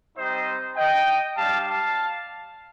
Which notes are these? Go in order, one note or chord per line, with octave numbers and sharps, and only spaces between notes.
G3 C4 D#4 C5 D#5
D#5 G5
G3 D4 G4 F5 A5
F5 A5